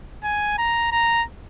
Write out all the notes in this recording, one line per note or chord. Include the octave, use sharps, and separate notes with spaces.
G#5
A#5
A#5